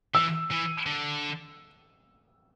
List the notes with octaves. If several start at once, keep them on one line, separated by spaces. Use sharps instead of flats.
E3 E6
E3
D3